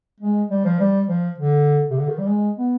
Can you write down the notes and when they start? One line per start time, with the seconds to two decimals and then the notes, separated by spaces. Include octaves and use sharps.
0.21 G#3
0.50 G3
0.65 F3
0.79 G3
1.09 F3
1.38 D3
1.90 C3
1.99 D3
2.08 D#3
2.18 G3
2.28 G#3
2.58 B3